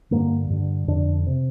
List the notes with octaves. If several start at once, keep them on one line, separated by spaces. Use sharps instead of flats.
G2 D3 A#3
G2 D3
F2 D3 D4
C3